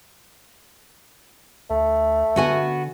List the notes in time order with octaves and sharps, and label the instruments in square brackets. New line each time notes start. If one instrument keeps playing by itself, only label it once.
[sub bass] D2 [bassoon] A3
[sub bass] D3 [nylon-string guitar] B3 F#4 G#5